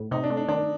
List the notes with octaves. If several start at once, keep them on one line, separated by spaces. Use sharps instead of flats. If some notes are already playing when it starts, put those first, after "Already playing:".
Already playing: A2
C3 D#4
D4
A3
D4
D#3 D4